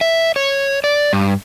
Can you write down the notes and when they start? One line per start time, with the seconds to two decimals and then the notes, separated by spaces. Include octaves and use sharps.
0.01 E5
0.36 C#5
0.84 D5
1.13 G2